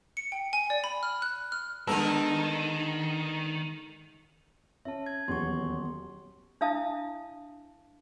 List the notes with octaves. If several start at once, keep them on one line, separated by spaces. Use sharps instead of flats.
C#7
G5
G#5
D5
B5
F6
F#6
F6
D3 D#3 G#3 B3 D#4 A4 A#4
C#4 E5 A5
G#6
D#1 E2 F#3 C6 C#6
D4 E4 E5 F5 A5 D#6